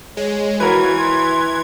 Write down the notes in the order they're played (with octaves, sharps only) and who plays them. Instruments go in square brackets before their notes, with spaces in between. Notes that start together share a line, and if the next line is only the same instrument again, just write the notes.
[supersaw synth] G#3 [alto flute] C#5
[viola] E3 [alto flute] F#4 [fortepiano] A#4 B4 [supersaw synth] G#6
[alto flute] C6